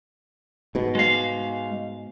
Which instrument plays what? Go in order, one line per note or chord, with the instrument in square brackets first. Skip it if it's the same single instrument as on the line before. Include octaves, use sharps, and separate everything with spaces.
[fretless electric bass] G#2 B2
[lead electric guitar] G#3 F5